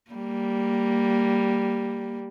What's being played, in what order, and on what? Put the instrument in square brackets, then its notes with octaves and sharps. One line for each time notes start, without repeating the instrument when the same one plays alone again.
[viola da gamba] G3 A#3